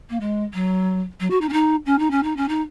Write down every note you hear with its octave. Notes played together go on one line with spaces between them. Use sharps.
A#3
G#3
F#3
F#3
F#4
D#4
C#4
D#4
C#4
D#4
C#4
D#4
C#4
D#4